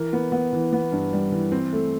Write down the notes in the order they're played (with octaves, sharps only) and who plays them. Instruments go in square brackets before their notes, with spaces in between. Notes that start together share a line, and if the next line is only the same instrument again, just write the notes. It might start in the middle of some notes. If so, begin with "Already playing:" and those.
Already playing: [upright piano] E3 A#4
B3
B3
E3
B3
G2
G3
E3
C4
A3